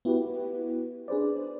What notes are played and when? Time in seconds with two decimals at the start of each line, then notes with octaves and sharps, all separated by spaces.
0.05 B3 E4 F#4 G4 B4
1.08 D4 G#4 B4 C5 D5